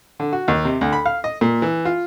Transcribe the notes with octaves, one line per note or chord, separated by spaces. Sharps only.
D3
F#4
D#2
C3
D2
B5
F5
D#5
A#2
E3
F4